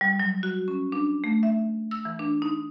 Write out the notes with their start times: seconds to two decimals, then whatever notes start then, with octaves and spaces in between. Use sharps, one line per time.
0.01 G3
0.19 F#3
0.43 F#4
0.68 C#4
0.92 D4
1.24 A3
1.43 E5
1.91 E6
2.05 E3
2.19 D4
2.42 D#4